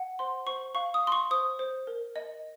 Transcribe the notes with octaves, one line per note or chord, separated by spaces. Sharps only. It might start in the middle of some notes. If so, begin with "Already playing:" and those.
Already playing: F#5
C5 C6
C5 C#6
F5 C#6
D#6
F5 C6
C#6
C5 D#6
C5
A#4
D#5